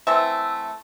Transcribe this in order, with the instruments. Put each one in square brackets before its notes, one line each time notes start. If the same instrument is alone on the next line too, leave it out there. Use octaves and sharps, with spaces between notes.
[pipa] E3 A3 C4 E5